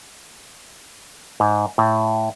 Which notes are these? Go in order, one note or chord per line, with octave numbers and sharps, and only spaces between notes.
G#2
A2